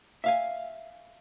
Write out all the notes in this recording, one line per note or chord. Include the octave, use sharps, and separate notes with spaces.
E5 F5 G#5